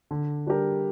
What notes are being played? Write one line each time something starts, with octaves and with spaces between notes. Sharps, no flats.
D3
G3 D4 G4 A#4